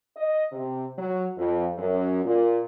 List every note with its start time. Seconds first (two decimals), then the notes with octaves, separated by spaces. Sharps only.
0.16 D#5
0.52 C3
0.98 F#3
1.38 F2
1.78 F#2
2.25 A#2